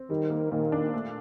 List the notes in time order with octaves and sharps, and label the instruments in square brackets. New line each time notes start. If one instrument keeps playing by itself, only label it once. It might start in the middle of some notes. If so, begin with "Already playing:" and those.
Already playing: [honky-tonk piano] C4
[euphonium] D#3 [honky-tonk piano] G3
[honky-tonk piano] A#3
[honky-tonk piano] A#2 [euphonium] D#3
[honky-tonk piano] D4
A3